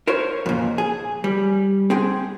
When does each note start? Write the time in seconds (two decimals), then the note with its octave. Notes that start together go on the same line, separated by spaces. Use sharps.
0.07 A#4 C5 C#5
0.46 F2 A#2
0.78 G#4
1.24 G3
1.90 C4 G#4 G5